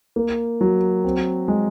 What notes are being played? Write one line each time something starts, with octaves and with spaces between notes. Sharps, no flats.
A#3
F#3
C4
G#3